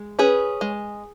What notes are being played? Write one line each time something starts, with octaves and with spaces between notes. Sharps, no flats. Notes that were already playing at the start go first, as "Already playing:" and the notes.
Already playing: G#3
C#4 G#4 B4
G#3